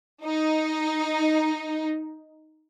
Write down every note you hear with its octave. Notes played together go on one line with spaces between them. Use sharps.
D#4